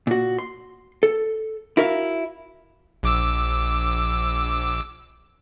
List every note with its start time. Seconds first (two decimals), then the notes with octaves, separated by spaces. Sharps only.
0.07 A#2 F#4
0.39 C6
1.03 A4
1.77 E4 F#4 A#4 E5 F5
3.03 A#1 D6 E6